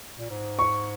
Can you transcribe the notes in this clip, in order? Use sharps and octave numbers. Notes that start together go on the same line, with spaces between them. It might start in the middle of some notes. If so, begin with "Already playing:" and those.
A#2
G#2
C#6